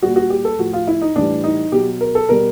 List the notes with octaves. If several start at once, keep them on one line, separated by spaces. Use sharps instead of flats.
A#2 G3 F#4
F#4
G4
A4
A2 F3 F#4
F4
E4
D#4
A2 E3 G3 D4
D#4
B2 F#3 G4
A#4
A4
B2 G3 A#4